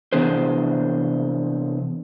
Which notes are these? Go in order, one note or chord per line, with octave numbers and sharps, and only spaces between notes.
C3 E3 B3 D4 G#4 C5